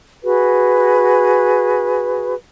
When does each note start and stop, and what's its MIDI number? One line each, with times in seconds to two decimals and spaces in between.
0.23 2.34 66
0.23 2.34 68
0.23 2.34 71